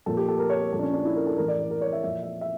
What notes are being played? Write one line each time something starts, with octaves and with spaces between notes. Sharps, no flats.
A#2 F3 A4
G4
A4
A#4
C#5
A#4
A#2 F3 A4
D4
C#4
D4
E4
A#4
A4
A2 E3 A#4
D5
A#4
A#4
C#5
E5
A#2 F3 E5
E5
E5